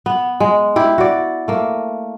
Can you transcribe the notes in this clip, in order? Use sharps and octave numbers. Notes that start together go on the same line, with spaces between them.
B3
G#3
E4 G4
F#4 D5
A3 A#3